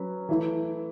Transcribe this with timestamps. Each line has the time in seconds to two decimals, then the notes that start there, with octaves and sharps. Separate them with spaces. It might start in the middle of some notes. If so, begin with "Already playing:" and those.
Already playing: F#3 C#4 B4
0.29 E3 A3 E4